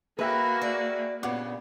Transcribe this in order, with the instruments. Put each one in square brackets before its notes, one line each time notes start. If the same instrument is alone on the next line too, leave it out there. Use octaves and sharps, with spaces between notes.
[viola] A#3 F#4 [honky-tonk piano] G#4 E5 G5 [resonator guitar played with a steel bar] B4
[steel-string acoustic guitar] D5
[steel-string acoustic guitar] G2 A#2 C#3 [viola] B3 [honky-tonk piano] F#5 D6